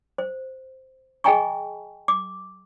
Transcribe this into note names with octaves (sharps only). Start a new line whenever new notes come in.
C5
G#4 D#5 G5 G#5 A#5 C#6
D6